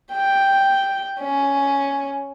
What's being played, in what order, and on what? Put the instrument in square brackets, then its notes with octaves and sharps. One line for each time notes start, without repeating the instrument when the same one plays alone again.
[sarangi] G5
C#4